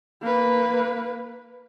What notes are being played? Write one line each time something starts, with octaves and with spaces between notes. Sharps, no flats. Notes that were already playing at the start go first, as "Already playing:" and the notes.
A#3 B4